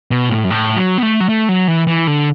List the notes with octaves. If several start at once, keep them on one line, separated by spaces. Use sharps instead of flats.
B2
A2
F#2
A2
F#3
B3
A3
F#3
A3
F#3
E3
E3
D3